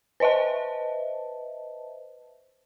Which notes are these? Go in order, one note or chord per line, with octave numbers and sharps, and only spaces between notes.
B4 C5 D#5 E5 A5